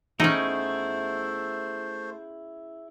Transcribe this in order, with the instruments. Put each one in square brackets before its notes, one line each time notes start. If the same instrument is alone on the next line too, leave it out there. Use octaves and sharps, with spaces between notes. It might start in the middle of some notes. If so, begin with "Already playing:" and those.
[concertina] A3 C5 [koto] C#4 D#4 [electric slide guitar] E4 G#4